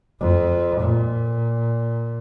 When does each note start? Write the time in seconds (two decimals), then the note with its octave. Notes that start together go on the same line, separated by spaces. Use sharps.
0.20 F2
0.80 A#2